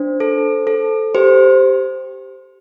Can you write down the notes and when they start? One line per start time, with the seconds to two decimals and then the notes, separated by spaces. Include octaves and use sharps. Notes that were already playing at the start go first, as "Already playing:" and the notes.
Already playing: D4 C5
0.20 A4
0.67 A4
1.15 G4 C5